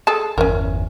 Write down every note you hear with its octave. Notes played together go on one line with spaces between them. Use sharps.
G#4 A4 A5
G1 E2 C#4 A#4